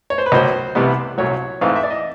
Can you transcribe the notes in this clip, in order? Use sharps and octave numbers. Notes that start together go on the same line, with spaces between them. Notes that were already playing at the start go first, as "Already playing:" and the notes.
C#5
C5
B4
C#2 B2 F#3 A#3 C5
C2 C3 E3 G3 B3
C2 A#2 F#3 C#5
G#2 E3 A3 C4 F5
E5
D5
D#5